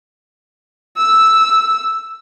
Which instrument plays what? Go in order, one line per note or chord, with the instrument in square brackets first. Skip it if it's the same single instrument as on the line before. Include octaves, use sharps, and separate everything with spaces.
[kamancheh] E6